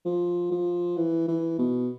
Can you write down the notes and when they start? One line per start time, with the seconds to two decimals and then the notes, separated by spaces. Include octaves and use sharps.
0.05 F3
0.51 F3
0.97 E3
1.28 E3
1.59 B2